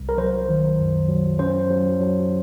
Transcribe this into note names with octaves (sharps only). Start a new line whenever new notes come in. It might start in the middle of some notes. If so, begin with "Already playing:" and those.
Already playing: C2
A#4
F#3 C5
D#3
F#2
F#3
C#4 C5
F#3
F#3